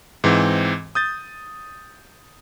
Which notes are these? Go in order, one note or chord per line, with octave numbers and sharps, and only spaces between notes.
G#2 E3 C4
D#6 G6 A6